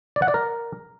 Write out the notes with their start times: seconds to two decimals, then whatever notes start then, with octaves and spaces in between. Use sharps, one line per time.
0.16 D5
0.22 F#5
0.28 D5
0.34 A#4